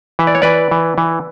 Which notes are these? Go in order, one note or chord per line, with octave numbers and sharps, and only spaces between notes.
E3 E5
D5
C#5
E3 B4 D5
E3
E3